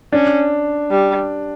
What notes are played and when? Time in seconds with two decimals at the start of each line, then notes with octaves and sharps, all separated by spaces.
0.13 C#4 D4
0.90 G3